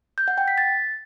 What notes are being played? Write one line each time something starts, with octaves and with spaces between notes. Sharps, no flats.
G6
F#5
G5
B6
A6